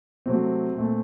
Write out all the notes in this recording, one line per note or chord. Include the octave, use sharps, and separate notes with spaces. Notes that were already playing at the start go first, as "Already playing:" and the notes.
C3 F#3 A3 C4
A#2 A3